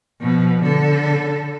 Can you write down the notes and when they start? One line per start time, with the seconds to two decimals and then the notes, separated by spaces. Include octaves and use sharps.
0.22 B2 F3
0.64 D3 A4